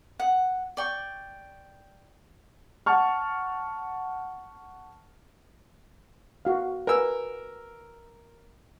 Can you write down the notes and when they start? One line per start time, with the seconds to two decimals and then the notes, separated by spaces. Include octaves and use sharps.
0.20 F#5
0.77 D5 G5 C#6
2.86 F#5 A5 C#6 F6
6.45 F#4 F5
6.87 A#4 B4 G#5 E6